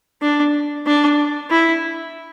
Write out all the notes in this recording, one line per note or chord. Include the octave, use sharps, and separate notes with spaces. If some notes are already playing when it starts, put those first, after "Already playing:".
D4
D4
E4